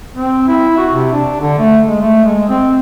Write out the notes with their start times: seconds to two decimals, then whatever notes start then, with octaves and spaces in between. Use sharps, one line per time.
0.15 C4
0.48 E4
0.78 F#4
0.91 C3
1.13 D4
1.41 D3
1.59 A3
1.88 G#3
2.02 A3
2.24 G#3
2.49 C4